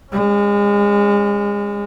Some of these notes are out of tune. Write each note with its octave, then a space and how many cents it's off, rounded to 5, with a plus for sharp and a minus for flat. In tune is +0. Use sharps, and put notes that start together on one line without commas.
G#3 -30 C#4 +0